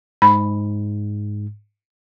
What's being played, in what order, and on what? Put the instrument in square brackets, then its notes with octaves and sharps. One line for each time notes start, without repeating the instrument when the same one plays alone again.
[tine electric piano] G#2 [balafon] B5